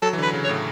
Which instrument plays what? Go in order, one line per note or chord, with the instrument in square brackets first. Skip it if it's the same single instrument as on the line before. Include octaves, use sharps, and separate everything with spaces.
[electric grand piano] F#3 [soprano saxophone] A4
[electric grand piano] E3
[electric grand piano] D3 [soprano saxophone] B4
[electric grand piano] C#3
[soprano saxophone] C#5
[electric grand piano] A2